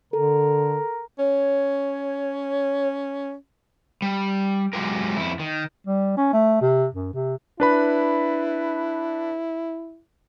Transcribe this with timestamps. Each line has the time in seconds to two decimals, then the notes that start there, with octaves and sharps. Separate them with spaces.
0.13 D3 A4 A#4
1.19 C#4 C#5
4.02 G3
4.73 F#3 G#3 F4 G4 A#4
5.17 F2 E4
5.39 D#3
5.87 G3
6.17 C#4
6.33 A3
6.62 C3
6.94 F#2
7.14 C3
7.60 D4 E4 B4 B5